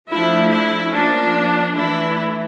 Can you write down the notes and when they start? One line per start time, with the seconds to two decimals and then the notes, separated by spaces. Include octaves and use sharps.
0.10 F3 A3 D4 E4
0.52 E4
0.93 F3 A#3 C#4 D4
1.76 E3 A3 D4 E4